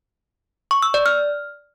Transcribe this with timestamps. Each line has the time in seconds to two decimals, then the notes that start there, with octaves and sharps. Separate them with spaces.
0.71 C#6
0.82 E6
0.94 D5
1.06 F6